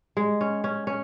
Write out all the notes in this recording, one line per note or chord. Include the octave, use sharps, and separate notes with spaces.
G#3
C#4
C#4
C#4